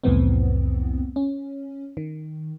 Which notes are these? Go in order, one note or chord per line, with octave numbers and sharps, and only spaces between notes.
C2 F2 A2 E3 B3 C4
C#4
D#3